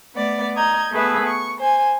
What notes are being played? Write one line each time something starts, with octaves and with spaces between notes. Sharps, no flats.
A3 B3 D5
D#5 A#5 G6 G#6
A3 B3 G#4 B4 E5
C#6
C5 G#5